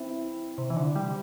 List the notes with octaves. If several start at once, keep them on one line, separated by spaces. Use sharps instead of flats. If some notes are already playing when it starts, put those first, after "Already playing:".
Already playing: C4 E4
C3
E3
D3
G3